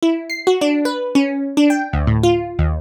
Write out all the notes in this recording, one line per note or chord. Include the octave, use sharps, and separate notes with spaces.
E4
C7
F#4
D4
B4
C#4
D4
G5
D2
A2
F4
D#2